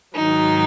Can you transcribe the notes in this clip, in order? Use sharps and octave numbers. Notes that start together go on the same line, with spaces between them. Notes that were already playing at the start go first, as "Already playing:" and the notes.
G#2 D#3 F#3 D#4